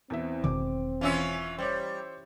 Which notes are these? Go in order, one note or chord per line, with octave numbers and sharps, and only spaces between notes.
E2 E3 C4 E5
E1 B2 D#3 D6
E3 C#4 F4 F5 G#5 E6
G3 C5 C#5 D6